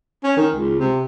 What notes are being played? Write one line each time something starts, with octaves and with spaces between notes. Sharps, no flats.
C#4
D#3
C#2
C3